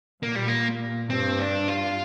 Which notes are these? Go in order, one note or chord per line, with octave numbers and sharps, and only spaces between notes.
A#2 A#3
G3
A#3
G2 C4
D4
F4